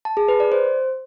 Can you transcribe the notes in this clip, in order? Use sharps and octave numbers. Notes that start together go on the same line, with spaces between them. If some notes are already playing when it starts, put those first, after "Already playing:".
A5
G#4
B4
D5
C5